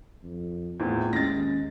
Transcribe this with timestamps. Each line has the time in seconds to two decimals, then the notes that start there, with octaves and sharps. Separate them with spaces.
0.23 F2
0.80 E2 A2 A3 C4 F4
1.13 D#2 G#3 C#4 A6 A#6